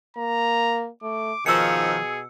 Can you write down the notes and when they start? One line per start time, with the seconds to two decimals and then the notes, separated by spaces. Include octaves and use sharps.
0.17 A#3 A#5
1.03 A3 D6
1.46 B2 D#3 F3 G#4 E6 C#7